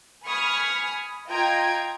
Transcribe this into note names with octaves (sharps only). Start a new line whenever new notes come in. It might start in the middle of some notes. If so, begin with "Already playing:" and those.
G#5 B5 C#6 D#6 F6 G#6
F4 D#5 G5 A#5 G#6 D7